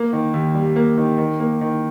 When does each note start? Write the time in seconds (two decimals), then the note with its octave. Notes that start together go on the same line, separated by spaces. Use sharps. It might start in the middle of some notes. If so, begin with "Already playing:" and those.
Already playing: A#3
0.13 D#3
0.34 D#2
0.55 G3
0.76 A#3
0.97 D#3
1.18 D#3
1.40 A#3
1.61 D#3